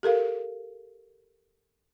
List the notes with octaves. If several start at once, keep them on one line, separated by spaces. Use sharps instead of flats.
G4 A4 A#4 F5